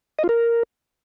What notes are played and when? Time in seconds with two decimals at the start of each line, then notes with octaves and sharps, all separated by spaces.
0.19 D#5
0.24 F4
0.29 A#4